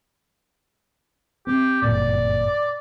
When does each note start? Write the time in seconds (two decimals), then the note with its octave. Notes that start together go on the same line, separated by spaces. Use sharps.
1.47 C4 G4
1.82 G1 F#2 A#2 D5